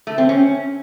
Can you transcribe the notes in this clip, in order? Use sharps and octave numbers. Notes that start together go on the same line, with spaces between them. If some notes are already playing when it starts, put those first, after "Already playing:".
A3
C4
C#4